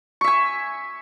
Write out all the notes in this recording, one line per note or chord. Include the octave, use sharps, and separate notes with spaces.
E5 G#5 C#6